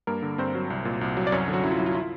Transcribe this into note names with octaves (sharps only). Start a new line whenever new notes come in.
G2 A#3 A#4
D3
G2 C4 C5
F#3
C2
A#2
C2
F#3
D5
F#2 C#4 C#5
D3
F#3 F#4
F#2 E4
F4
F#3 E4
F4
E4
F4